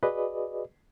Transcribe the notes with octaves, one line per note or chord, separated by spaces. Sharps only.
F#4 G#4 B4 D5 D#5